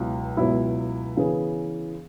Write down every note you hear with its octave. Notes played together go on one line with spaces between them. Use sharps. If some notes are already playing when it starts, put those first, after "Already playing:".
Already playing: C#2 B2 F#3 E4
C#2 B2 F#3 E4
C#3 E3 B3 G#4